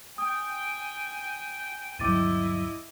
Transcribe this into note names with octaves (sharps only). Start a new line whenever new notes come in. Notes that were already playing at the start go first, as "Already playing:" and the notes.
G5 G#5 D#6
D2 G2 F#3 E4 D#5 D6 A6 D#7